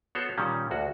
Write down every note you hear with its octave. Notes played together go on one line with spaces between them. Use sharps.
B3 F#4 A4 C5 C#5
A#2 D#3 G3 C#4
D2 F#4